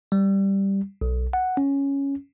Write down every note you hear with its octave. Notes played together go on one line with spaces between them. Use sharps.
G3
B1
F#5
C#4